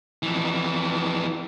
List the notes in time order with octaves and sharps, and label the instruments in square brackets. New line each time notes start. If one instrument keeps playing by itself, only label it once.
[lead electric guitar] F2 E3